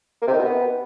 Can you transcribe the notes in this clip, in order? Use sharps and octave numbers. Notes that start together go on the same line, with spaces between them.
A#3
C3
D#3
B2
B3